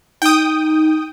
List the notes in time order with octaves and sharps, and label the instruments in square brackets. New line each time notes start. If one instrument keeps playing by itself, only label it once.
[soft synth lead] D#4 [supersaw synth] G5 D#6